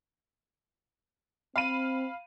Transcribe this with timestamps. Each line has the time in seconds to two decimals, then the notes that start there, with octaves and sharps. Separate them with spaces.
1.56 C4 F5 B5 D#7